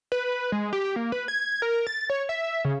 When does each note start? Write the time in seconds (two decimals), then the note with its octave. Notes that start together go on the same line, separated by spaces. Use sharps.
0.12 B4
0.52 G#3
0.73 G4
0.96 A#3
1.12 B4
1.28 G#6
1.62 A#4
1.87 A6
2.10 C#5
2.29 E5
2.65 C#3